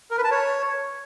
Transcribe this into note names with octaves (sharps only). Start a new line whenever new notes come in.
A#4
B4
A5
C#5